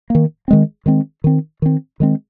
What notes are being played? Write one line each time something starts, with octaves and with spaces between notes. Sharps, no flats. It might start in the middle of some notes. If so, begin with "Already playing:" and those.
D#3 A#3
D#3 G#3 C4
D#3 G#3 C4
D#3 C4
D#3 C4
D#3 G#3 C4